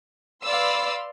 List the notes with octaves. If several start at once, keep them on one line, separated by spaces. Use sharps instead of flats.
B4 D5 F5 B5 C6 E6